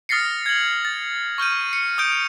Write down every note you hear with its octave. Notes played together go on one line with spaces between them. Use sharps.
D#6 F6 A6 A#6 C7 C#7
G#6 F#7
A6
C#6 F6 G6 D#7
C#7
D#6 F6 G6 D7